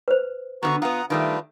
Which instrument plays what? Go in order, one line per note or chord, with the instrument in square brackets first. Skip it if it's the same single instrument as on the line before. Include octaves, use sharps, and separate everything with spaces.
[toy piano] B4 C5
[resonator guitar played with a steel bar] D3 F3 B3 [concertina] F#4 A#5 C#6
[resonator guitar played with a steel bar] B3 F4 [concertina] F#5 A#5 D#6
[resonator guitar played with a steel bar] D#3 G3 A3 [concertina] D4 F4 B4